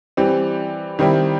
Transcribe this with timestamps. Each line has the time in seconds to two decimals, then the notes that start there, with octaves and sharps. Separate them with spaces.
0.17 E3 G3 C4
0.99 D#3 G3 C4 E4